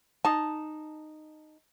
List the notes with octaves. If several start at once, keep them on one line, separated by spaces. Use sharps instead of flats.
D#4 A5